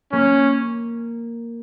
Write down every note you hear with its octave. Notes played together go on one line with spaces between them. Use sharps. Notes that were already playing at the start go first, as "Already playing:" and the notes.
A#3 C#4